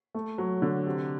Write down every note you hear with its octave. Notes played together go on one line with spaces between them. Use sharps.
A3
F#3
D3
C3